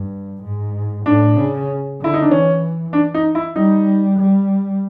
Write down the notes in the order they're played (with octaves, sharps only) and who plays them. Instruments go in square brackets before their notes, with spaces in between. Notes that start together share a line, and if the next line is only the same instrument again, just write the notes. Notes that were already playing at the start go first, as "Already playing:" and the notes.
Already playing: [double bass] G2
G#2
[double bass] A2 [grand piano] D4
[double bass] C#3
[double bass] D3 [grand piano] E4
[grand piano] D#4
D4
[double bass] E3 [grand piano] C#4
[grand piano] D4
D#4
E4
[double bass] G3 [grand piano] D#4
[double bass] G3